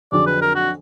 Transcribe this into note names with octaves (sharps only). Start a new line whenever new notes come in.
F2 D3 F#3 D4 G#4 D5
B4
A#4
F#4